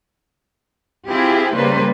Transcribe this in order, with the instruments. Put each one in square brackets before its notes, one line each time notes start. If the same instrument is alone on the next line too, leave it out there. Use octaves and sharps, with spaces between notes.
[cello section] C4 E4 F4 G4 G#4
C#3 G3 A#3 B4 C5